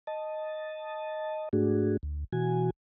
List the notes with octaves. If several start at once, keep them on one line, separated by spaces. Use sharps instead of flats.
D#5 A5
G#2 A3 D4 F#4 G#4
D2
B2 E3 F#4 G#5